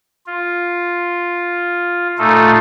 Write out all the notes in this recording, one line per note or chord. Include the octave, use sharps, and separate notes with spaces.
F4
A#2 A3 D#4 F4 A4